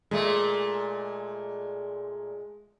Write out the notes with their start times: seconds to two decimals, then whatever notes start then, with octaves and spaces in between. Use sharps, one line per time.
0.11 A#2 G#3 A3